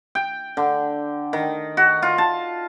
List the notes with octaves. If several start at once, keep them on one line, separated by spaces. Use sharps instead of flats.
G5
D3
D#3
F#4
F4
A5